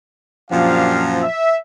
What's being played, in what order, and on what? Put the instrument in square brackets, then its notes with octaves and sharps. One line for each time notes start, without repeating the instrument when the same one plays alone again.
[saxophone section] F#2 A#2 F3 [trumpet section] D4 G4 F5
[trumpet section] E5